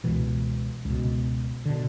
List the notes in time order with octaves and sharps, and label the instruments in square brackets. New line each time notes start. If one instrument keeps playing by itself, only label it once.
[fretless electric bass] C#2 B2 E3
C#2 B2
B2 D3